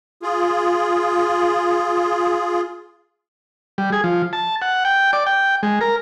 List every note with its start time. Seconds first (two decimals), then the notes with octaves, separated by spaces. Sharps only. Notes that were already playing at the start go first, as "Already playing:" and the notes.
0.22 F4 G#4
3.78 G3
3.92 G#4
4.04 F3
4.33 A5
4.62 F#5
4.85 G5
5.13 D5
5.26 G5
5.63 G#3
5.81 A#4